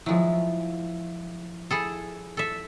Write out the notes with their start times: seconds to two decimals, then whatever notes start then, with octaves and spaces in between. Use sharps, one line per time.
0.06 F3 F#3 G#3 E4
1.71 E4 G#4 A4
2.37 A4 E5